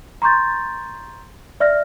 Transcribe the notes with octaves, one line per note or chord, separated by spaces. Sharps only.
A#5 C6 C#6 G6 A6
D5 E5 F6 A#6